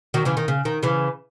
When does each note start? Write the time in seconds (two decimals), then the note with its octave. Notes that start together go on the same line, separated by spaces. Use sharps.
0.14 D#3 F#3
0.25 C#3 E3
0.37 D#3
0.48 C#3
0.65 D#3
0.83 C#3 E3